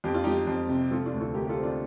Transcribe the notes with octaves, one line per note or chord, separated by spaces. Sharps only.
F2 G4
F4
F3 D#4 G4
F2
C3
F3 F4 A4
D4 F4
D2
F4 A4
D2 G4 A#4
G4
F4 A4
C4
D4 F4